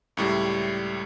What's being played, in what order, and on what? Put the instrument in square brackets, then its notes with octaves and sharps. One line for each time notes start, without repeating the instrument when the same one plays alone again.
[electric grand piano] C#2 A2 G3